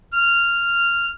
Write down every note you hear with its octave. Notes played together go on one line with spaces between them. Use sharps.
F6